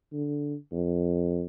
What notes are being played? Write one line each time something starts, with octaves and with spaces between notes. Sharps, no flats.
D3
F2